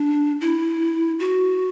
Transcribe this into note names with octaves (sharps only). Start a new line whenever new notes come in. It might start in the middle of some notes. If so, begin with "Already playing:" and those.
Already playing: D4
E4
F#4